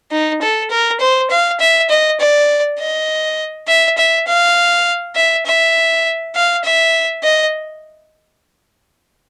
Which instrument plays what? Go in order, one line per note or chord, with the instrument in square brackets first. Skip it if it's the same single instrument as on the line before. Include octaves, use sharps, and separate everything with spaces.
[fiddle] D#4
A4
A#4
C5
F5
E5
D#5
D5
D#5
E5
E5
F5
E5
E5
F5
E5
D#5